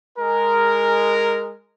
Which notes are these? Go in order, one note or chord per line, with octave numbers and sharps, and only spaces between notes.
G#3 A#4